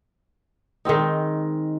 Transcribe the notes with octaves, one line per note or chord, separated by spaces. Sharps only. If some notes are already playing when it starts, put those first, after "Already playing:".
D#3 G#3 C4 D#4